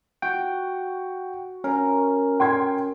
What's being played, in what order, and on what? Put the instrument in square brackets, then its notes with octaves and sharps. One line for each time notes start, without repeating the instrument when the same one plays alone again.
[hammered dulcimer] F#4 [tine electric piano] G5
[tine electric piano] C#4 [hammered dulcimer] A#4
[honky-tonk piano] G5 C6 G#6